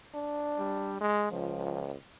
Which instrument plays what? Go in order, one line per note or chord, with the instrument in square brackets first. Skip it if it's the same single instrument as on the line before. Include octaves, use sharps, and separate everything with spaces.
[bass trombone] D4
[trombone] G3
G#3
[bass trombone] C#2 [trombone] F3